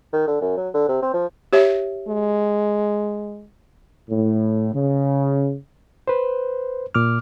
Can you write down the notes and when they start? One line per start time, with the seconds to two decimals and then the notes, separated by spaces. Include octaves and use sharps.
0.13 D#3
0.28 D3
0.41 F#2
0.57 F#3
0.74 D3
0.88 C3
1.02 C4
1.14 F3
1.53 G4 C#5 E5
2.08 G#3
4.10 A2
4.74 C#3
6.08 B4 C5
6.95 A#2 D6 F6